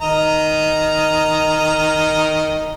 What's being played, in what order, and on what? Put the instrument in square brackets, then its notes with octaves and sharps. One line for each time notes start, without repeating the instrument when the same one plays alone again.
[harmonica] D#3 D#5 A#5